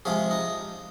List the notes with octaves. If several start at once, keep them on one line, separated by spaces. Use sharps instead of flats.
C3 F3 G#3 G#4
D#4